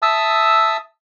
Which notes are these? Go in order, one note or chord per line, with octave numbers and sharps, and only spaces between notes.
E5 A5 D#6 E6